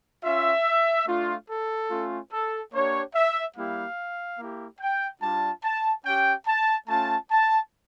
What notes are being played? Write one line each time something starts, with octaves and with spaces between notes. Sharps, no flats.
C#4 F4 E5
A3 D4 F4
A4
A3 C#4 F4
A4
A#3 D4 G4 C#5
E5
G3 A#3 E4 G4 F5
A#3 E4 G4
G5
G3 D4 F4 A5
A5
C#4 G4 G5
A5
A3 C#4 F4 A5
A5